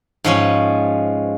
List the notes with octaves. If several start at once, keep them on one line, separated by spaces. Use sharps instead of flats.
G#2 F3 C#4